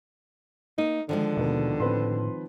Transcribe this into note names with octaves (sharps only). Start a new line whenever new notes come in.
A#3 D#4
D3 D#3 F3 G#3
D#2 B2 B3
A2 C4 B4 C6